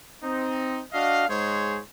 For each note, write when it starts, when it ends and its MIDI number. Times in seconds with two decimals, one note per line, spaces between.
0.24 0.80 60
0.24 0.80 63
0.93 1.28 62
0.93 1.28 66
0.93 1.28 75
0.93 1.28 77
1.28 1.78 44
1.28 1.78 56
1.28 1.78 68
1.28 1.78 72
1.28 1.78 73